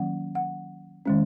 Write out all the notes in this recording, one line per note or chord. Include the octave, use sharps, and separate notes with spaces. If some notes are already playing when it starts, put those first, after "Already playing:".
Already playing: D#3 F#3 A#3 C#4 F#5
F#5
D#3 G#3 C#4